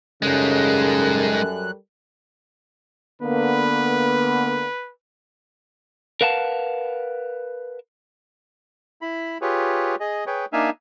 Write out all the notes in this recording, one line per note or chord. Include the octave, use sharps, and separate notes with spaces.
F#2 C#3 G3 G#3 D#4 A4 A#4 F#6
D3 A#3 B3 B4
A#4 B4 F5 F#5 A5
E4 B5
F4 G4 G#4 B4 C#5
G#4 D#5
G#4 B4 C#5 G5
A#3 D4 D#4 E5 F5 G#5